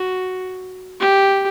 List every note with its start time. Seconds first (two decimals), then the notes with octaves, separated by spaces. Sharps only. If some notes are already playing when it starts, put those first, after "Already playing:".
Already playing: F#4
1.00 G4